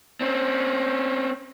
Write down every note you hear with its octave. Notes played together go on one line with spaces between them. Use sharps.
C4 C#4